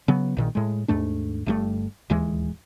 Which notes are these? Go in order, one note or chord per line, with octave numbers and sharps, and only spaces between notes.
C#3 F#3 B3
A#1 A#2 D#3
A2 G#3
D#2 G#2 A3 D4
G1 G2 A3
D1 D#2 E3 G#3